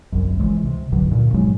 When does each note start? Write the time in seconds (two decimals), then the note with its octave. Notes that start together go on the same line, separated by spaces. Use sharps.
0.12 G1 C2 F#2
0.39 C#2 C3 E3 G#3
0.65 C3
0.92 C2 G2 D3 F#3
1.11 D2 A#2
1.34 G#2 B2 F#3 G#3